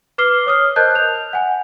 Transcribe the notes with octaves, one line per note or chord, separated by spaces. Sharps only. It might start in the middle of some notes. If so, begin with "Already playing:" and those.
B4 D6 F6 C7 G7
C#5 D#6 F6
A#4 C5 D#5 A5 F#6 G6
F7
F#5 G#5